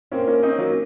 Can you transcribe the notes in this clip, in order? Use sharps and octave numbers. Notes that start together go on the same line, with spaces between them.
A#3 C4 C#4
A#3 C#4
C4 C#4 D#4
F#3 A#3